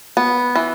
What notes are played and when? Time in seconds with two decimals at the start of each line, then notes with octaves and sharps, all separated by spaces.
0.17 B3
0.55 E3